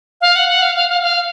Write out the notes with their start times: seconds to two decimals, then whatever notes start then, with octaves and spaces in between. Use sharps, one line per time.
0.21 F5
0.35 F#5
0.48 F#5
0.62 F5
0.75 F5
0.89 F5
1.02 F5